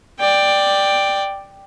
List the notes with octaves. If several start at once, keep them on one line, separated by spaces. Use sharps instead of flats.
D5 G5